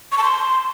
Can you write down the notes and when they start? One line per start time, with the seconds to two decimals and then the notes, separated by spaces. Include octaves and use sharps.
0.12 C#6
0.18 A5
0.24 C6